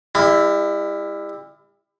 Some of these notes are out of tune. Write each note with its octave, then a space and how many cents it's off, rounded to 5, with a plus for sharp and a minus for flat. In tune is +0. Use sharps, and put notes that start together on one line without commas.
G3 +40 E4 +0